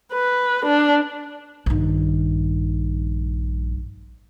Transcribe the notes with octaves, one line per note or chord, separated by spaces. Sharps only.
B4
D4
A#1 G2 D#3